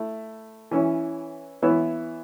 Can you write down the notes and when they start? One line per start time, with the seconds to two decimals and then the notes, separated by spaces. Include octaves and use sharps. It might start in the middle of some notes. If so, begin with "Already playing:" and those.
Already playing: A3 E4
0.71 E3 C#4 E4 C#5
1.62 E3 B3 E4 C#5 E5